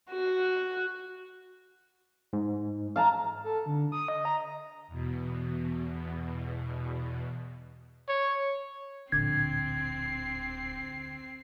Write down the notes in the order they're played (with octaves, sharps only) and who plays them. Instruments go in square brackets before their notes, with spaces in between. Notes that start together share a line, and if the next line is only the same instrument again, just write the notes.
[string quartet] F#4
[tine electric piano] G#2
[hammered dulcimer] F5 A5 A#5
[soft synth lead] A4
D3
D#6
D#5
A#5
[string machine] E2 B2
[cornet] C#5
[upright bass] D1 A#1 [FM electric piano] D3 D6 [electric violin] C4 C7 [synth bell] G#6